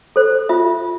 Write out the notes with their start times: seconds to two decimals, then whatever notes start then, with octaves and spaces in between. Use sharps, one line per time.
0.16 A4 C5
0.49 F4 E5